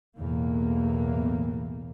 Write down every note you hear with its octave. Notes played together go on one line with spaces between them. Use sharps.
B1 E2 A2 A#3